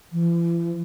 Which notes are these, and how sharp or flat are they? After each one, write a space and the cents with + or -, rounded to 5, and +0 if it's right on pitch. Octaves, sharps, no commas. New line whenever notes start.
E3 +45